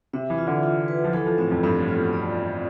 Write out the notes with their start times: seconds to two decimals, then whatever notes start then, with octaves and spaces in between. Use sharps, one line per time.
0.13 C3 E5
0.30 E3
0.38 F4
0.47 D3
0.63 F4
0.88 B4
1.04 F3
1.13 E3 A4
1.26 F3
1.38 A2 C4
1.51 F2
1.63 G2 C4
1.80 A2
1.88 F4
1.97 B2
2.13 D5
2.38 C4